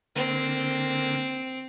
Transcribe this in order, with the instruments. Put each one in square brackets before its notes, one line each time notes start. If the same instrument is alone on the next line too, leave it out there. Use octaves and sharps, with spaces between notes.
[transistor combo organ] D3 A#3 [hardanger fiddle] C4